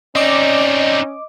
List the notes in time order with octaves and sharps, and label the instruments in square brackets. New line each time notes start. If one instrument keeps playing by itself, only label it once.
[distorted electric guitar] C4 D#4 [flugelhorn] C#4 [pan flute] D5 [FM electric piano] D#5 D6